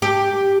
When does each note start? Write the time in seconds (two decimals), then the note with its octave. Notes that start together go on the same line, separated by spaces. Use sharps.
0.02 G4